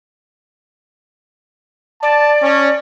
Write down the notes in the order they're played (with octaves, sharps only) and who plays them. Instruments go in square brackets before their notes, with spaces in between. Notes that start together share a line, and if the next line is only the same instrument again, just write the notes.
[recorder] D5 [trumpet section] A5
[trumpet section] C#4